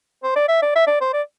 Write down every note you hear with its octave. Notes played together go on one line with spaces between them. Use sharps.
C5
D5
E5
D5
E5
D5
C5
D5